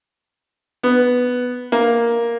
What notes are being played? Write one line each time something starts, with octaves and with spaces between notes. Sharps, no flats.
B3
A#3